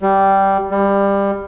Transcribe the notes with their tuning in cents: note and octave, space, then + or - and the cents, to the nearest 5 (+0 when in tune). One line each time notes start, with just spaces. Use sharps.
G3 -10
G3 +20